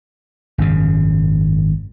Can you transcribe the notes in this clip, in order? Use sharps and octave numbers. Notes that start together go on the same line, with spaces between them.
G#1 F#2 C#3